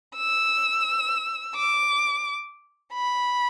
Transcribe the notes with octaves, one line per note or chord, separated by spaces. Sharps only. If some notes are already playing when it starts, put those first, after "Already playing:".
E6
D6
B5